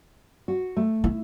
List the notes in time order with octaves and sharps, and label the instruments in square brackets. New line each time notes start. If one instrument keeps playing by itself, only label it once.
[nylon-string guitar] F#4
A3
[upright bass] E4